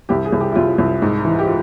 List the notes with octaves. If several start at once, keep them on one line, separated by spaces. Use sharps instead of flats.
C2 G4
G#4
C2
G4
E4
C2 F4
C2
G#2
E3
G4
F4